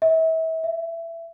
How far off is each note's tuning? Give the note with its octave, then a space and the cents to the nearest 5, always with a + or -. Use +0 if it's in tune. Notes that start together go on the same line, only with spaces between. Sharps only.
E5 -35
E5 +20